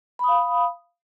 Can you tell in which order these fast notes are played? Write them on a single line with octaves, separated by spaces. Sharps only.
B5 D#6 F5